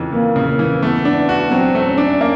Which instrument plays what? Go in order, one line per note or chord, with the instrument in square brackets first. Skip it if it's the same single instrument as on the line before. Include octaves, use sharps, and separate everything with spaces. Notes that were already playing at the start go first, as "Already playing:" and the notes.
Already playing: [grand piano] F2 C#3 E3
[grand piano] F2 [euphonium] A#3
[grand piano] C#3
[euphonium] A#3
[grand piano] E3
[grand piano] A3 [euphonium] B3
[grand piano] D4
F#4
[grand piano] F#3 [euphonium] C4
[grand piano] A3
[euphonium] C#4
[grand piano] D4
A#3